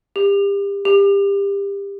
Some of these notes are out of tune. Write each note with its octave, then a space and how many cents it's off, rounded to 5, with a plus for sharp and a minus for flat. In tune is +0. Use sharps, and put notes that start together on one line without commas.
G4 +30
G4 +25